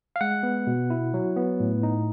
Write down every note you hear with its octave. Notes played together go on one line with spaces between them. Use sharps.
F5
G#3 F#5
B3
B2
E4
F#3
B3
A2
D#4